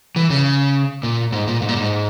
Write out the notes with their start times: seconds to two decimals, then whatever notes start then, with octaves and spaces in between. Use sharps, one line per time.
0.16 E3
0.30 C#3
1.03 A#2
1.32 G#2
1.47 A#2
1.62 G#2
1.69 A#2
1.76 G#2